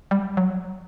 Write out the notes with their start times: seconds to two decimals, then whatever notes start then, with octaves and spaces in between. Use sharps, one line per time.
0.11 G3
0.37 F#3